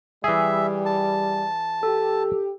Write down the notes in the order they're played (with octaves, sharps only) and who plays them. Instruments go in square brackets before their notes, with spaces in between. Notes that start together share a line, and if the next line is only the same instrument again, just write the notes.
[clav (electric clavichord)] E3 G#4 [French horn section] G3 [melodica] E5
[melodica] A5
[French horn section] G4 [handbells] A4